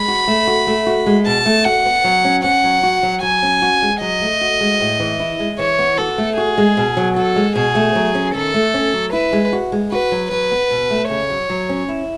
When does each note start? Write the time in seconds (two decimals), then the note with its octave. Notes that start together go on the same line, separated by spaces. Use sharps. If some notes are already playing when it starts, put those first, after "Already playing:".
Already playing: G#3 B5
0.08 F#4
0.28 A3
0.47 F#4
0.67 A3
0.87 F#4
1.06 G#3
1.26 B2 A5
1.45 A3
1.65 F#4 F#5
1.85 B3
2.04 F#3
2.25 C#4
2.44 C#4 F#5
2.64 F#3
2.83 F#4
3.03 F#3
3.22 F#3 G#5
3.42 C#4
3.62 F#4
3.82 G#3
4.01 F#3 D#5
4.21 A3
4.41 F#4
4.61 G#3
4.80 A2
5.00 E3
5.20 E4
5.40 G#3
5.59 E3 C#5
5.79 B3
5.98 F#4 A4
6.18 A3
6.37 F#4 G#4
6.58 G#3
6.77 B2
6.97 F#3
7.16 F#4 A4
7.36 G#3
7.55 B2 G#4
7.75 A3
7.95 F#3
8.15 C#4
8.34 D#3 A4
8.54 A3
8.74 C#4
8.93 F#3
9.13 E4 B4
9.33 G#3
9.53 F#4
9.72 G#3
9.92 F#4 B4
10.12 F#3
10.31 F#3 B4
10.51 B3
10.71 B2
10.90 A3
11.10 C#3 C#5
11.30 F#3
11.50 F#3
11.69 C#4
11.89 E4